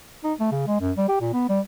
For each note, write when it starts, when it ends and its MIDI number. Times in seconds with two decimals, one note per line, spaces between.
0.24 0.33 63
0.40 0.48 57
0.51 0.66 49
0.67 0.80 56
0.80 0.91 42
0.97 1.06 55
1.09 1.18 67
1.20 1.31 46
1.33 1.45 59
1.49 1.60 55